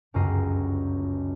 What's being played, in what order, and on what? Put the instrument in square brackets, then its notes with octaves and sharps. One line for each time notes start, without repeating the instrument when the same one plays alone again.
[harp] G1 C#2 F#2 D#5 A#5 C7